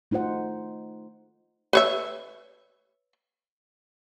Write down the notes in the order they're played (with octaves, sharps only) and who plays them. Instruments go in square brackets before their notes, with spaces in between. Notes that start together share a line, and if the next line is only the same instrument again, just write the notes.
[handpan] A3 D#4 F4 C5 F#5
[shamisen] B4 C#5 E5